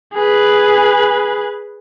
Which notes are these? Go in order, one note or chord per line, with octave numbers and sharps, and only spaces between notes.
G#4 B4